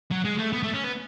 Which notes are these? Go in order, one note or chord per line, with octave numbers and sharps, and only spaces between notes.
F#3
G#3
A3
B3
A3
C#4
B3